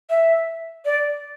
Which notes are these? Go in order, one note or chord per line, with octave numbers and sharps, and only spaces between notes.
E5
D5